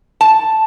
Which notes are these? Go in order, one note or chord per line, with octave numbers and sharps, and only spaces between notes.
A5